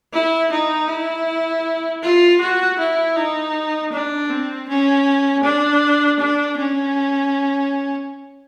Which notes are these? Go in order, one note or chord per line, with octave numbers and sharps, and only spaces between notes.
E4
D#4
E4
F4
F#4
E4
D#4
D4
C4
C#4
D4
D4
C#4